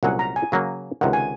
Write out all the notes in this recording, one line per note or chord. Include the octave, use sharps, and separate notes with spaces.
C2 A#2 F#3 C#4 G#4 F#5
A#5
G#5
C#3 F#3 A#3
C#2 C3 D#3 F#5
G#5